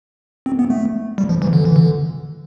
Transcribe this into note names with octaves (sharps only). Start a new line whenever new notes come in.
C4
B3
A3
G3
F3
E3
D3
E3
D3